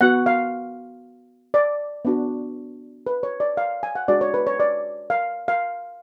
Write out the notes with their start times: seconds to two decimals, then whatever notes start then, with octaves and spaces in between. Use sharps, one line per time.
0.01 B3 F#4 F#5
0.26 F5
1.54 D5
2.05 B3 D4 F#4
3.07 B4
3.23 C#5
3.40 D5
3.57 F5
3.83 G#5
3.95 F#5
4.08 G#3 D4 F#4 D5
4.21 C#5
4.34 B4
4.47 C#5
4.60 D5
5.10 F5
5.48 F5